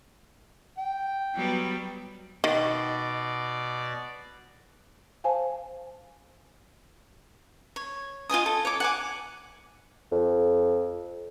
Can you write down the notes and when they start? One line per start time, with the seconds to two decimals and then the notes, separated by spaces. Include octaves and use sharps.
0.78 G5
1.35 F#3 G3 B3
2.44 B2 D#3 D5
5.24 C5 F5 G#5 A5
7.76 C#5
8.29 F4 D#5 G#5 D#6
8.46 A4
8.65 C#5 D6
8.80 F#5 G#5 D6
10.11 F2